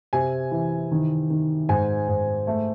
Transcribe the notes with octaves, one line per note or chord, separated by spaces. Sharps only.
C3 G#5
E3
D#3
D#3
G#2 G#5
G#2
A3